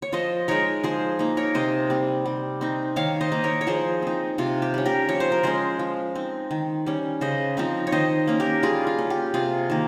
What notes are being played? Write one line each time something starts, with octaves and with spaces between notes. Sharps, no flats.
C#5
F3 C5 D#5
G#3 D#4 A#4 C#5
F3 G#4 C5
A#3 D#4
A#4 C#5
C3 C5 D#5
G3 C4
G3
C4 D#4
D#3 C#5 F5
C5 D#5
A#3 D#4
A#4 C#5
C#5
F3 G#4 C5
C4 D#4
C3 F4
G4
G3 C#4
G4 A#4
F3 C#5
C5
A#4
G#3 C#4 G#4 C5
F3
C4 D#4
D#3
G3 C#4
C#3 C5 D#5
F3 C4 D#4
C#5
D#3 C5 D#5
A#3 C#4
G4 A#4
G3 F4 G#4
F4
C#4
G4
C3 F4 G#4
D#3 A#3